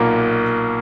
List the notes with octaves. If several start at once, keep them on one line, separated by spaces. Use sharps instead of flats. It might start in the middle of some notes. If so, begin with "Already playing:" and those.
Already playing: B1 A#2 A#3